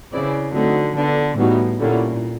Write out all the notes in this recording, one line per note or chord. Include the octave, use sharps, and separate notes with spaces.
C#3 C4 E4 G#4 B4 D5
D3 F#3 A3 C4 D#4 F#4
D3 B3 D4 F4 A4
A2 E3 G3 B3 D#4 F#4
A#2 D3 G3 A#3 C#4 E4